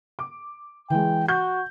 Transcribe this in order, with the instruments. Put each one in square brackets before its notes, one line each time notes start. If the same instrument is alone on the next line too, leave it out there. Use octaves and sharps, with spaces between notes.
[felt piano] D6
[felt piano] E3 G#3 [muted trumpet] G5
[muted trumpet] F#4 [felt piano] G6